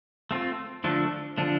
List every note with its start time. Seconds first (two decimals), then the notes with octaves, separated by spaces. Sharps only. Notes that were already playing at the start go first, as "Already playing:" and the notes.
0.31 A3 C4 F4
0.84 D3 F3 A3 D4
1.38 D3 F3 A3 D4